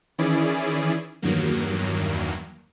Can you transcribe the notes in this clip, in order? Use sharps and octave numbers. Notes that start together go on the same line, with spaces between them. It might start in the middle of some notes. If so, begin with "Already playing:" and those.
D#3 E3 C#4 E4 G#4 D5
E2 G2 D#3 F#3 A#3